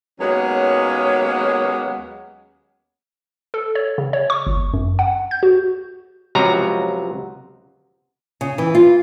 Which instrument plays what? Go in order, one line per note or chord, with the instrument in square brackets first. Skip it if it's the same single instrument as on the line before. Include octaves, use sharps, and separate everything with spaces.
[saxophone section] D#2 F#3 G#3 A#3 B3 C#4
[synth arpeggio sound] A4
C#5
C#3
C#5
C#6
G1
F#2
F#5
G6
F#4
[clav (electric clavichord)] C#2 C3 F3 F#3 F#4 A#5
[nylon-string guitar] C#3
E3
F4